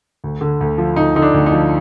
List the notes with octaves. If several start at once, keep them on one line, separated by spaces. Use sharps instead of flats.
D2
D3
D2
F3
D2 D#4
D3 D#4
D4
D2
D#4
F3